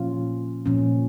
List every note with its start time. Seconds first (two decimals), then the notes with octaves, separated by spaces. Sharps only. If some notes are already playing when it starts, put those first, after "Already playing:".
Already playing: A#2 F3 C#4 F4
0.66 A#2 F3 C#4